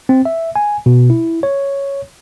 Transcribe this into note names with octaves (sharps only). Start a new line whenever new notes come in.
C4
E5
G#5
B2
E4
C#5